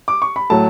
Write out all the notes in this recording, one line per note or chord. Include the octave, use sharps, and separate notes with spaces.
D6
C#6
B5
A2 F#3 A3 A5